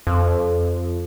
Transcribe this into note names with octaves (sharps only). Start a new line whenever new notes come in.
F2